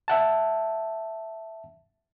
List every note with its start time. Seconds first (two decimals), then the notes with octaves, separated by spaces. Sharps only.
0.08 E5 F#5 A5